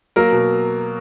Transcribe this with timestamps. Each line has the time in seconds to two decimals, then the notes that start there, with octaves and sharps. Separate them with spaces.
0.16 F#3 A#3 A#4
0.32 B2